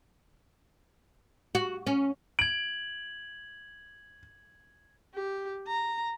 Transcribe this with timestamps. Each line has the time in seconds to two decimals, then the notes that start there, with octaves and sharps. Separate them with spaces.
1.55 F#4
1.87 C#4
2.39 G#6 D7 F#7
5.15 G4
5.68 A#5